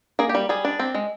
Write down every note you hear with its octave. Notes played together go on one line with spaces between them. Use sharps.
A#3 G#4
G4
G3
G3 G#4
D4
C4
G#3